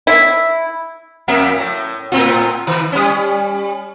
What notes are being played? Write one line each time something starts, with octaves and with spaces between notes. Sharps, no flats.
E4
F2 A#3 E5
A2
A2 C4 F4
D#3
G3 C#4